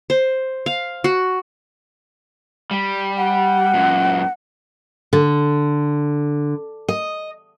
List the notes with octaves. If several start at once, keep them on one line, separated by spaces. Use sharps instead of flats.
C5
F5
F#4
G3
F#5
F#2 A#2
D3
D#5